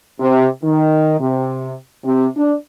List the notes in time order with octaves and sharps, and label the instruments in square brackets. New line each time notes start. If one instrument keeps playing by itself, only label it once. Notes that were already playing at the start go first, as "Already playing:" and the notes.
[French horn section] C3
D#3
C3
C3
D4